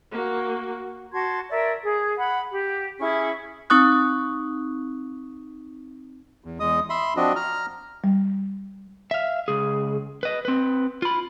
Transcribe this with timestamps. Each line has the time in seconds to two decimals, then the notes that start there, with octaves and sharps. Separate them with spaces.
0.11 A#3 F#4
1.12 F#4 A5 C6 G#6
1.49 A#4 C#5 D5 E5
1.82 G#4
2.17 F#5 B5
2.51 G4
3.00 C#4 E4 G#4 C#6
3.70 C4 D#4 C#6 D#6 F#6
6.44 E2
6.60 E2 G#3 D#5 D#6
6.90 E5 B5 C6
7.17 F3 C4 D4 F#4 D#5
7.36 A#5 F6
8.04 G3
9.11 E5 F5
9.48 C#2 G#4
10.23 B4 D#5
10.45 C4 B4
11.02 F4 B5